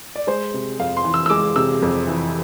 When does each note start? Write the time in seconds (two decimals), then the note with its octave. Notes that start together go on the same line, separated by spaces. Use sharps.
0.16 D5
0.27 G#3 C5
0.54 C3
0.79 F2 F5
0.97 C6
1.04 E3
1.14 E6
1.26 E6
1.30 G#3 D6
1.56 C3 E6
1.82 F2
2.08 E3